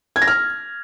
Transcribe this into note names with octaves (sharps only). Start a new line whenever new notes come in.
G#6
A#6
F6